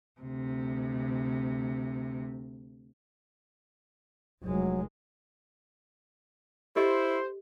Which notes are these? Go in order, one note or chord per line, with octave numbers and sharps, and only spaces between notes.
D2 C3
F1 F#3 G#3
E4 G4 A4 C5 D#5